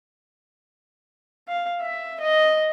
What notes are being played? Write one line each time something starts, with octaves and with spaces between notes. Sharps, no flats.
F5
E5
D#5